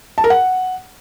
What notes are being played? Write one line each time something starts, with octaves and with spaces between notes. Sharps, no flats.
A5
A#4
F#5